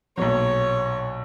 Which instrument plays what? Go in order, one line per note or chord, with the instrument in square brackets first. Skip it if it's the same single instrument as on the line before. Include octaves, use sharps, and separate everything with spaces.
[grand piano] B1 A#2 F#3 [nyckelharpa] C#5